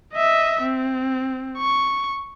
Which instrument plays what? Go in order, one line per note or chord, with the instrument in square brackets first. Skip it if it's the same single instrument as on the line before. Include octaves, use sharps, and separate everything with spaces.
[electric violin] D#5 E5
C4
C#6